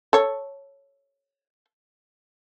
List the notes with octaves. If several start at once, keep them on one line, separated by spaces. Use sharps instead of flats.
A4 C#5